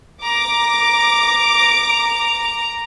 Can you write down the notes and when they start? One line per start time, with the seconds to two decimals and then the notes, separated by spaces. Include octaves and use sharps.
0.23 A#5 D6